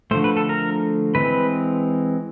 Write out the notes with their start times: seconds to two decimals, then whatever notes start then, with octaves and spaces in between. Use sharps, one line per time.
0.11 D3 F3 A3 C5
0.24 B4
0.37 A4
0.49 A#4
1.15 E3 G#3 C4 B4